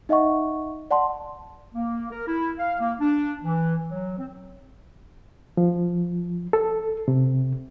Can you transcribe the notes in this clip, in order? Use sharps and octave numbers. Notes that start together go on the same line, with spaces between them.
D#4 D#5 E5 F#5 C#6
D5 F#5 A5 C6
A#3
A#4
E4
F5
A#3
D4
E3
F#3
C4
F3
A4
C3